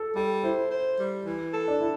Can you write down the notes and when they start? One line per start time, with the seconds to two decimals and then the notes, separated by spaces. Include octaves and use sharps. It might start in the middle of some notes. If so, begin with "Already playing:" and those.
Already playing: A4
0.16 G3 A4
0.44 E4 C5
0.71 C5
0.99 G3
1.26 E3
1.54 A4
1.68 D4
1.81 E4